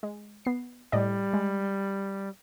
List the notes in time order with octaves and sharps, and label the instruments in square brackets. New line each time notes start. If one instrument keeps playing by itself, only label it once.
[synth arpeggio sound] G#3
B3 C7
[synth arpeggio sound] A2 D5 D#5 [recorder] G3
[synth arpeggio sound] G#3